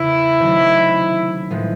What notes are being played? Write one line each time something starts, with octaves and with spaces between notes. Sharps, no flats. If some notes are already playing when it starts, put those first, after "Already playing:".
Already playing: E2 C#3 E3 E4
C3 D#3 F#3 A3 C#4
A2 F3 G#3 B3